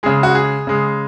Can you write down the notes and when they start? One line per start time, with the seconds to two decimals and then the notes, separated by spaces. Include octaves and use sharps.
0.03 C#3 G#3 G#4
0.23 F#4
0.35 G#4
0.67 C#3 G#3